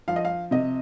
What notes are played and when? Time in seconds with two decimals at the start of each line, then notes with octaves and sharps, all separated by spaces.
0.08 F3 F5
0.16 D#5
0.25 F5
0.51 C3 D#5